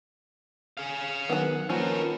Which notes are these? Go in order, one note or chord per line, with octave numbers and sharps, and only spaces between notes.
G#4 F5
D#3 F#3 B3 F#5
D#3 F3 F#3 A#3 C#4 A#4 B4